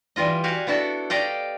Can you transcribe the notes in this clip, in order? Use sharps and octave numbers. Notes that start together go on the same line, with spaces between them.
E3 G3 F4 D#5
F#4 G4 F5 G#5
B3 D4 E4 F#4 A4
G4 D5 D#5 F5 G5